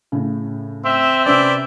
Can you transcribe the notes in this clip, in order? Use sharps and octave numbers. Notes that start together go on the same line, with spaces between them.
A2 C#3
C4 E5
C3 C#4 B4 D5 E5